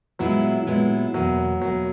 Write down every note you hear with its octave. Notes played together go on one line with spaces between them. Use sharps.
A#2 F#3 G#3 B3 E4
A#2 G#3 B3 E4
E2 B2 F#3 A#3
E2 B2 F#3 A#3